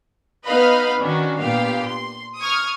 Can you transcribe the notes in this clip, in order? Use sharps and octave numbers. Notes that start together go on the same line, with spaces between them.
B3 D#4 B4 D#5 F5 B5
D#3 C#4 D4 F#4
A#2 B3 G4 F5
C6
C#6 D#6 F6 G#6